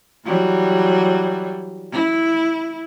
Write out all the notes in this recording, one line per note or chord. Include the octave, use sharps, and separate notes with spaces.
E3 F#3 G3
E4